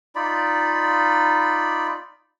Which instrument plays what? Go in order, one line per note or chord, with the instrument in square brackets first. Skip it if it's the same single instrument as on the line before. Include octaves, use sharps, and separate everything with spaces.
[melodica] D#4 F4 D5 B5